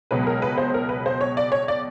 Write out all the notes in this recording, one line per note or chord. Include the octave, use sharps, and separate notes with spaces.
C#2 B2 F#3 B4
A#4
B4
C5
A#4
B4
C5
C#5
D5
C#5
D5